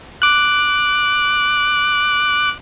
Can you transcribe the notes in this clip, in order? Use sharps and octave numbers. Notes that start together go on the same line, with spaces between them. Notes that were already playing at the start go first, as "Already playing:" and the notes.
D6 F#6